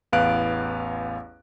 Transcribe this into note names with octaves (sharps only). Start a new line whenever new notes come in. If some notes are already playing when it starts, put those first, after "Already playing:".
A1 E2 B3 F5 F#6 D7